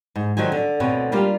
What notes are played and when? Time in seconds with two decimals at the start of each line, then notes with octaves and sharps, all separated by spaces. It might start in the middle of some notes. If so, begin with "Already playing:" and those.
0.16 G#2
0.37 D3 D#3 F3 F#3 D#4 G#5
0.52 D3
0.80 D2 B2 D3 C4 C#5
1.12 G3 A#3 D4 F4 G4